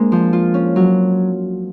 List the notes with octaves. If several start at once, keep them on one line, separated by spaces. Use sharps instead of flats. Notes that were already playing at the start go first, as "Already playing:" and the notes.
Already playing: G#3 A#3 C4 D4
F3
F4
C#4
F#3